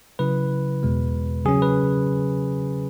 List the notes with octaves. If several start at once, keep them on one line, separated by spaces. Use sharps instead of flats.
C#3 F#3 E4 B4
E2 B2 G#3
C#3 F#3 C#4 G#4
B4